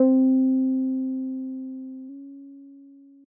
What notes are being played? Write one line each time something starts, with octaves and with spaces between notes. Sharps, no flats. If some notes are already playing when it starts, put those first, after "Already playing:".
Already playing: C4
C#4